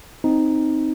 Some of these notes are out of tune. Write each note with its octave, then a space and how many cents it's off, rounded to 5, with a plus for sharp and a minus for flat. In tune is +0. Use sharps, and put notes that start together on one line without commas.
C4 +0 D#4 +0